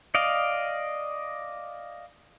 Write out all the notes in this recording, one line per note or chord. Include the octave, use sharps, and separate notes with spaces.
D5 D#5 F5